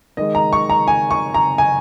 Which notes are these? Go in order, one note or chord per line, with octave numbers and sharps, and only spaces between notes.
D#3 G#3 D#5
A#5
C#6
A#5
G#5
C#6
A#5
G#5